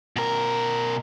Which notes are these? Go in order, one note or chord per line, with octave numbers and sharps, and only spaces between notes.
B2 A#4